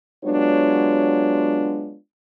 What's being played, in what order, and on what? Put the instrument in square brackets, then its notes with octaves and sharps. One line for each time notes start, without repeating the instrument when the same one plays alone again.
[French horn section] F#3 G#3 B3 D4 F4 C#5